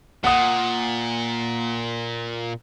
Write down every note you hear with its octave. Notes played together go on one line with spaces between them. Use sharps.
A#2 F#5 D#6